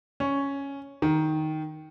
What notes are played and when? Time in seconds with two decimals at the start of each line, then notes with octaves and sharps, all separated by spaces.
0.20 C#4
1.02 D#3